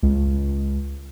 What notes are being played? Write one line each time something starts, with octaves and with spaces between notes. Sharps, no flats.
C#2